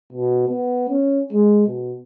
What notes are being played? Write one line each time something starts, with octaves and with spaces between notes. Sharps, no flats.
B2
B3
C#4
G#3
B2